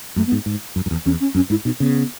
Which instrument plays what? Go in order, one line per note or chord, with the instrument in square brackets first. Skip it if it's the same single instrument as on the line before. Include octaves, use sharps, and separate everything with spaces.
[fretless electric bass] F#2 [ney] A3
[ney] B3
[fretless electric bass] G#2
G#2
F#2
F#2
E2
[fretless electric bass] E2 [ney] C#4
[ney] C#4
[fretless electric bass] F#2 [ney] C#4
[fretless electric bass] G#2 [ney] E4
[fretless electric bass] B2 [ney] D#4
[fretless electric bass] C#3 [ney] B3